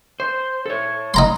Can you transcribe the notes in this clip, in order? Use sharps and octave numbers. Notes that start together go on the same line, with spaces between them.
C5
A4 C#5
D#4 A#5 C6